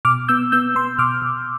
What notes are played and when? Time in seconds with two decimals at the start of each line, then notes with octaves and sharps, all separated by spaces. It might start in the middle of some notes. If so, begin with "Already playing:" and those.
0.05 B2 D6 F6
0.28 B3 E6 G6
0.52 B3 E6 G6
0.75 B3 C6 E6
0.99 B2 D6 F6
1.22 B2